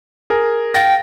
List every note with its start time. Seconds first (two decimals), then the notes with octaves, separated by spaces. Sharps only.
0.30 G#4 A#4 G#5
0.74 F5 G5 A6 A#6